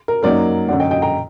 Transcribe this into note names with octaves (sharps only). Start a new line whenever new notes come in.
A#4
F#2 F#3 A#3 D#4 A#4 D5
F#2 D3 F#3 D5 F#5
D#5 G5
D#5 G5
G5 A#5